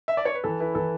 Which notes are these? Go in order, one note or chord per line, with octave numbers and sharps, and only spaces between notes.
E5
D5
C#5
B4
E3 A4
E4 B4
E3 A4